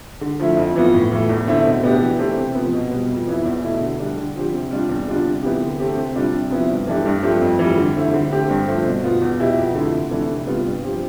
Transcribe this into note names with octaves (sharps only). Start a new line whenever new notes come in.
D3
F3 A3 E4
F2
E3 B3 F4
A2
E3 A3
E2
D3 A3 C4 E4
B2
B3 D4 G4
E3
A3 C4 E4 G4
C3
F3 B3
B2
G3 B3
F2
E3 B3 E4
E2
B2 A3 E4
D3
G3 D4
D3
F3 C4 G4
C3
G3 D4 F4
E2
D3 G3 D4 F4
C3
E3 B3 E4 G4
D3
A3 C4 G4
C3
G3 D4 F4
C3
F3 B3 E4
G2
E3 A3 D4 G4
G2
F3 A3 C4 G4
F2
E3
G3
D3
A3 C4 E4
D3
A3 C4 G4
G2
F3 A3 C4
B2
B3 F4
E2
B2 B3 E4 G4
F2
D3 A3 E4
C3
E3 A3 D4
C3
G3 B3 F4
G2
F3 C4 G4